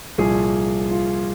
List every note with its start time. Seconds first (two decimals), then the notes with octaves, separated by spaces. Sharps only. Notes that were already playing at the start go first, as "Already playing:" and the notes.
0.18 C2 A#2 F3 G#4
0.91 F4